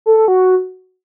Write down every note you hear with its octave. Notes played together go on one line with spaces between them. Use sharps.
A4
A4
F#4